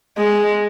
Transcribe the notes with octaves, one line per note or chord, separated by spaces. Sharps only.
G#3